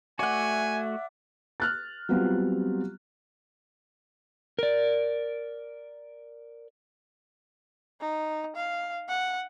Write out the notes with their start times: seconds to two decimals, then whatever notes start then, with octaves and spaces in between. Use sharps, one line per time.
0.19 A3 F#4 D5 E5 F#5 G#5
1.60 F6 F#6 A6
2.09 F#3 G3 B3 C4 F4
4.59 A#4 D5
8.01 D#4
8.56 F5
9.08 F#5